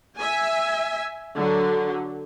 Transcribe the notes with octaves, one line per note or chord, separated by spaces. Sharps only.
E5 G#5
D3 F#3